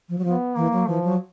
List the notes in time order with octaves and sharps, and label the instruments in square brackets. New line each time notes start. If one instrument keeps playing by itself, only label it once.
[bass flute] F3
F#3
[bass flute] F3 [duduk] B3
[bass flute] E3 [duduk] A#3
[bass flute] F#3
[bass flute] E3 [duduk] F3
[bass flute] F#3